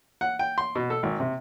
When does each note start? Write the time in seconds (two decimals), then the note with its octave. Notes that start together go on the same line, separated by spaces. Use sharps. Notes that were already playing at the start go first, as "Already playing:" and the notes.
0.21 F#5
0.39 G5
0.58 C6
0.76 B2
0.90 A4
1.03 G#1
1.20 C3